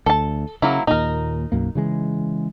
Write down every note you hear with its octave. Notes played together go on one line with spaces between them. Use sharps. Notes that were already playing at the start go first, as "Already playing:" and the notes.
D2 A4 A5
C#3 F#3 A#3 E4
D#2 A#2 D#4 A#4
B1 F#2 A#3
C#3 E3 G#3